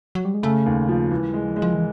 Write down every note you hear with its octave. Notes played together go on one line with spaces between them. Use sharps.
F#3
G3
G#3
C#3 A3
D#2
F3
E3 G#3
G3
G#3
F3
G#3
F3
E3